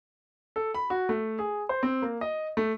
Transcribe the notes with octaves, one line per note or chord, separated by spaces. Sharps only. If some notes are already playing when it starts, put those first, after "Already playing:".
A4
B5
F#4
A3
G#4
C5
C4
A#3
D#5
A3